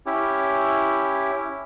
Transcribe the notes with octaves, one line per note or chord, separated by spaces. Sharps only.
C#4 E4 G4